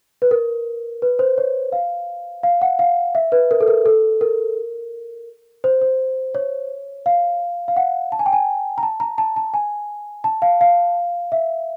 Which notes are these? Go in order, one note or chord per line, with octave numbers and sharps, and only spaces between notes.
B4
A#4
B4
C5
C#5
F5
F5
F#5
F5
E5
B4
A#4
A4
A#4
A4
A#4
C5
C5
C#5
F5
F5
F#5
A5
G#5
G5
G#5
A#5
A5
A#5
A5
A5
G#5
A5
F5
F5
E5